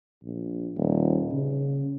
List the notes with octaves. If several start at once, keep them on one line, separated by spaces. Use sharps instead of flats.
A#1
D#1
C#3